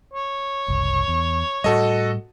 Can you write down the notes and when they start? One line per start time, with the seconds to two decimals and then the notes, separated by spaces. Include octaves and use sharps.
0.13 C#5
0.68 F#1 C2
1.08 E2
1.64 A2 G3 F#4 A4 D#5